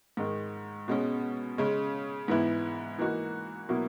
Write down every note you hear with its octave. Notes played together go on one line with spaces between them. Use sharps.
G#2 D#3 G#3
B2 G#3 C#4
C#3 G#3 C#4
G#2 E3 B3 E4
E3 A#3 D#4 F#4
B2 F#3 A#3 E4